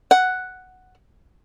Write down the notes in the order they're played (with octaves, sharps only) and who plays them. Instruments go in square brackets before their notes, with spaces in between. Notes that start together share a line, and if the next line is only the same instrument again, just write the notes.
[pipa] F#5